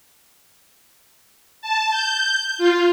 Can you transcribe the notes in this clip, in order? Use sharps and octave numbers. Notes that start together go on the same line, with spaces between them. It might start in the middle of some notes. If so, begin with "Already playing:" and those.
A5
G6
F4